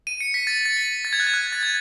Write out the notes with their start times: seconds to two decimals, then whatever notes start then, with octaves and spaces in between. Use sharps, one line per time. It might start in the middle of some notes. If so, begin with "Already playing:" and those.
0.07 D#7
0.21 C#7
0.34 B6
0.47 A6
0.65 A6
0.76 B6
1.05 A6
1.13 G#6
1.20 F#6
1.27 G#6
1.34 F#6
1.52 A6
1.63 G#6